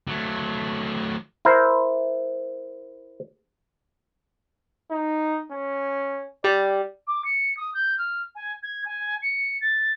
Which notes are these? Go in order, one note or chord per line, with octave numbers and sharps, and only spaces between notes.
F#3 A3
E4 A#4 C5
D#4
C#4
G3 D5
D6
C#7
D#6
G6
F6
G#5
G#6
G#5
C#7
A6